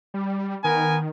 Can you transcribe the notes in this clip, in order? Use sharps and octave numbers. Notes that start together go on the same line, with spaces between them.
G3
D#3 B3 A#4 G#5